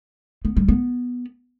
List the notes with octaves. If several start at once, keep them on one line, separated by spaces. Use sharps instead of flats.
B3
G3
B3